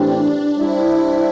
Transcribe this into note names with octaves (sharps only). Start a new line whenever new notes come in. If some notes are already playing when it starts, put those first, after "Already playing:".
Already playing: A2 E3 C4 D4 G4
G3 D4 E4 C5